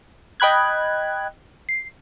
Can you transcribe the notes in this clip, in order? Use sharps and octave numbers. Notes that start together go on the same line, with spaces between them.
D#5 G5 B5 F#6 G#6
C7